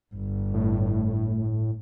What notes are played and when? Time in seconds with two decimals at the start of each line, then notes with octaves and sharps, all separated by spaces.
0.14 G1
0.54 A2